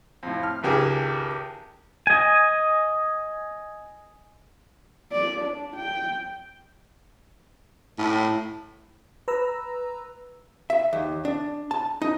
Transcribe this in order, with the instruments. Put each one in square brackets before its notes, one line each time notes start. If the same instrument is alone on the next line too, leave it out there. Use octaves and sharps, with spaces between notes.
[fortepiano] F2 A2
F6
G#1 C#2 G4 G#4 A#4
[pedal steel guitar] D#5 G#5
[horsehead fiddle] D5
D4
G5
[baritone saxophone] A2
[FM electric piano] B4 A#5 E6
[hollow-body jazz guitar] E5
D#2
D4
A5
D#4